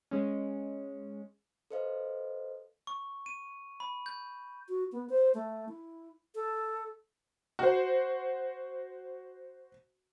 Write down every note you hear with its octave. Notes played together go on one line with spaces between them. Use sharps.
G#3 C#4
A4 B4 C5 D#5 F5
C#6
D#7
B5
G6
F#4
B3
C5
A3
E4
A4
F#4 C5